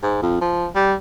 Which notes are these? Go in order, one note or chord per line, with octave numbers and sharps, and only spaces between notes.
G#2
F2
F3
G3